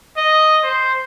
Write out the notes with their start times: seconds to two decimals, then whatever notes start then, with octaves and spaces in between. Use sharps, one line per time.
0.17 D#5
0.64 C5